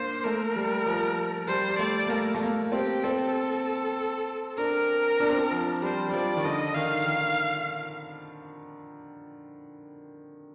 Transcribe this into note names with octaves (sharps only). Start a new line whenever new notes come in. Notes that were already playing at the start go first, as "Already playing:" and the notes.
Already playing: A#3 D4 C5
A3 A#4
G3
F3
G3 C5
G3
A3 D5
A#3
A3 A#4
A3
A#3
C4 G4
C4 A4
D4 A#4
D4
C4
D4
F3
G3 C5
G3
F3 D5
D#3
D3 D#5
D#3 F5
D#3